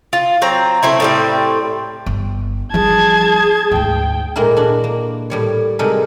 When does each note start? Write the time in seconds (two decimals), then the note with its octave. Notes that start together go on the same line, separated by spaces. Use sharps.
0.13 F4
0.42 F#3 C4 A#5
0.83 A3 C4 E4
1.00 A2 G3 C4
2.06 G1
2.74 F3 G3 G#4 A5 G#6
3.71 D2 G#2 G5
4.36 A#2 G#3 A#3 E4 A#4
4.57 D4 F#4
4.84 A#3
5.30 A2 G3 C#5
5.79 C3 G3 G#3 D#4 A4 A#4